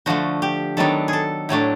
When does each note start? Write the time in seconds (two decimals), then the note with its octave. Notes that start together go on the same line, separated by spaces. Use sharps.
0.06 D3 F3 A3 F#4
0.42 G4
0.77 D#3 F#3 B3 D4 A4
1.08 G#4
1.13 A4
1.49 A2 F#3 A3 D4